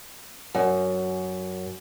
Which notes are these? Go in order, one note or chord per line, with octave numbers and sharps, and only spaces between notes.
F#2